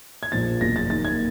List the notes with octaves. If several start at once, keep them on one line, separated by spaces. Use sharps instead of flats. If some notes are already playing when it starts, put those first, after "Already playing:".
G#6
A#1 A#2 F3 A6
F#1 E2 B2 A#6
A6
D#2 D#3 A6
G#6